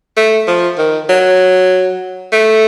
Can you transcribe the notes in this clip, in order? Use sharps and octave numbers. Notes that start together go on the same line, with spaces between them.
A3
F3
D#3
F#3
A3